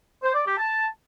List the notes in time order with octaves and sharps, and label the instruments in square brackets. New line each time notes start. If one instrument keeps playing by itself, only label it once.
[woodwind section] C5
D5
G4
A5